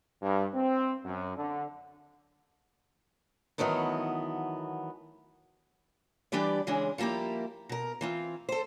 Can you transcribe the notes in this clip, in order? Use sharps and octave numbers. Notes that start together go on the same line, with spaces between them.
G2
C4
F#2
D3
D#3 E3 F#3 A3 B3
E3 G3 D4 G4 B4 D5
C#3 E3 G#3 C#4 D4 G#4
F3 G3 A#3 E4 G4
B2 A#4
E3 C4 F4
A4 C5